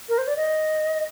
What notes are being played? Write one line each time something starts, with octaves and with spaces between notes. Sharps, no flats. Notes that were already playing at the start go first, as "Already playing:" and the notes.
A#4
C5
D5
D#5